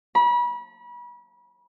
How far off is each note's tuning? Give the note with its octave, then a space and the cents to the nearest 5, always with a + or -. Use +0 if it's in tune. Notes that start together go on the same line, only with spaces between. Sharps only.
B5 -35